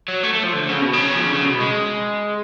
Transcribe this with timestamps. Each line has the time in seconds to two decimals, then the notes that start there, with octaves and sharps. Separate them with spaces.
0.08 F#3
0.23 A3
0.33 A3
0.43 F3
0.53 D3
0.69 C#3
0.81 B2
0.94 C#3
1.04 F#3
1.14 F3
1.25 D3
1.35 C#3
1.46 B2
1.60 G#3